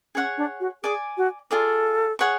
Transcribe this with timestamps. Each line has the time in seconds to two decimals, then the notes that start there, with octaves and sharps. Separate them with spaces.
0.15 C#4 G#4 C#5 F#5
0.38 D4
0.60 F#4
0.83 G#4 D5 G#5 D6
1.17 F#4
1.51 F4 G#4 A4 D5
2.19 G#4 C#5 F#5 C#6